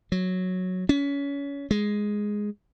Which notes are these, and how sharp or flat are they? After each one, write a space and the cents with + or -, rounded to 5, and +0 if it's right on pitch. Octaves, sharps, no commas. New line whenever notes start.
F#3 -5
C#4 +25
G#3 +0